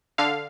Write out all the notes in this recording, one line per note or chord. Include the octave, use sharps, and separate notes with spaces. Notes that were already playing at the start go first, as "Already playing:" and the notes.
D3 F5